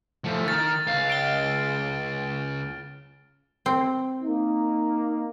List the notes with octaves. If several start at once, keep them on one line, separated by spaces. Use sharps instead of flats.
F3 A3
D#3 F6 A6
C#2 F5
D7 G7
C4
A#3 D#4